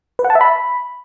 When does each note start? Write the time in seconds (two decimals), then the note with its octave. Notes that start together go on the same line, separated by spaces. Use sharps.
0.19 B4
0.24 F#5
0.30 A5
0.35 E5
0.41 B5